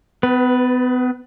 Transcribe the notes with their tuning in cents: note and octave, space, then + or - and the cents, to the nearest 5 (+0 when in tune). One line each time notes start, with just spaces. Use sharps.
B3 +35 B4 +0